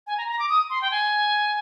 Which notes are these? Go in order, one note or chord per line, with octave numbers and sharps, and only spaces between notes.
G#5
A#5
A#5
D6
D#6
C6
G5
G#5